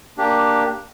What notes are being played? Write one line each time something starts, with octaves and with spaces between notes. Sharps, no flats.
A#3 D4 G4